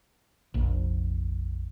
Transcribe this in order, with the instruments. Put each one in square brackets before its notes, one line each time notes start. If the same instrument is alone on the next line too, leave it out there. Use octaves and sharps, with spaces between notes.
[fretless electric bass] F1 A#1